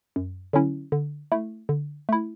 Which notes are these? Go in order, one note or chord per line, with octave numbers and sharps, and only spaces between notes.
F#2
D3 F#3 C#4 E4
D3
A3 E4
D3
A3 E4